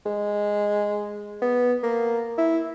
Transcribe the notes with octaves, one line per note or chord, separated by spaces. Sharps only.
G#3
B3
A#3
E4